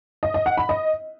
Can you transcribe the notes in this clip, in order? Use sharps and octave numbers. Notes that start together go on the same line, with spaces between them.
D#5
D#5
F#5
B5
D#5